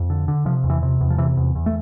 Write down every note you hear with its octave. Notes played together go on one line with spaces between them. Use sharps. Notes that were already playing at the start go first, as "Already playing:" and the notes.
Already playing: F2
D3
D3
C3 F3
E2
E3
C3
E2
F3
C3 E3
E2
E2
A3